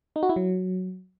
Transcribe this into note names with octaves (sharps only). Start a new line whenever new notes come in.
D#4
F#4
E4
F#3